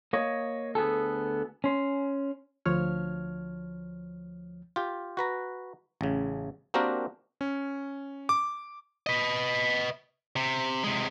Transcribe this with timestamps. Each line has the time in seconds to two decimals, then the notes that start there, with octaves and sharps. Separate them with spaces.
0.13 A#3 C#5 D#5
0.75 D2 B3 G#4 A4
1.64 C#4 C6
2.66 D2 F3 C#5 F6
4.76 F4 G4
5.17 F#4 B4 A#5
6.01 A1 C#3
6.74 A#3 C4 D4 F#4 G4 A#4
7.41 C#4
8.29 D6
9.07 B4 D#5
10.36 C3
10.84 C3 G#3